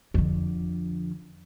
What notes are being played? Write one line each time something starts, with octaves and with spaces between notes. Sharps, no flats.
F2 D3